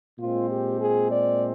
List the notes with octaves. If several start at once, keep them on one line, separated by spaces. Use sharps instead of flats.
A#2 G#3 C4 F4
G4
G#4
D5